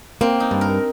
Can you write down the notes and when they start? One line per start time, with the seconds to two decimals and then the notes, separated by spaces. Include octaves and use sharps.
0.21 A#3 C4
0.40 D#4
0.51 G2
0.61 A#4